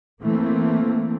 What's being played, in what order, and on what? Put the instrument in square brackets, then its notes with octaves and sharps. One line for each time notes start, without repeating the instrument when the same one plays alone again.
[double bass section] E3 A3 A#3 C4